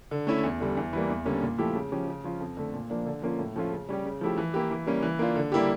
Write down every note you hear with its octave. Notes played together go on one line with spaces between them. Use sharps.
D3
A3 C#4 E4
E2
D3 G3
E2
E3 G3 A#3
E2
D3 G3 A#3 C#4
A#2
F3 A3 E4 G4
C#3
F3 C#4 G4
C#3
F3 C#4 F4
F2
D3 A3
A#2
F3 A#3 D4
D3
F3 A#3 C#4 F4
A2
F3 A3 C#4 F4
C#3
G3 C#4 G4
C#3
F3 A3 E4 G4
E3
A#3 E4 G4
E3
G3 A#3 C#4
E3
A#3 D4 F4
D3
G3 A#3 E4 G4